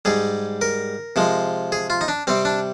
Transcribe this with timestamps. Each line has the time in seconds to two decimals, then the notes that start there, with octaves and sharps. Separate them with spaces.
0.05 G#2 G3 G#4
0.61 A#4
1.16 C3 F3 G#3
1.72 G#4
1.90 F4
2.01 D#4
2.08 D4
2.27 C3 G3 C4
2.45 D4